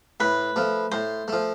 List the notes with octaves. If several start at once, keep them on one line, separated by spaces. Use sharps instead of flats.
A2 B4
F3 A3
A2 C5
F3 A3